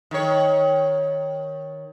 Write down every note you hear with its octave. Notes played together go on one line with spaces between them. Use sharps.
D#3 C#5